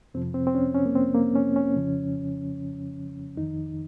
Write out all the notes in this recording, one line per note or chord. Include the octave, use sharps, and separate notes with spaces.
F2 C3 F3 C4
C4
C4
C#4
C#4
A#3
C4
A#3
C#4
C#4
F2 C#3 F3
F2 D#3 D#4